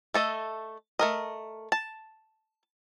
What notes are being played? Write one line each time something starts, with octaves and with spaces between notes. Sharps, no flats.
A3 A4 D#5
A3 A#4 D#5
A5